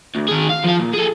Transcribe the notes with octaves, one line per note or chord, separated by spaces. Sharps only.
D2
D#3 G#4
F5
F3 F5
A#2
G#4 A4